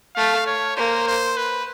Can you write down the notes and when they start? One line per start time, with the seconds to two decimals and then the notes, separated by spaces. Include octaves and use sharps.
0.16 A3 F5
0.47 C#5
0.77 A#3 C5
1.07 C5
1.37 B4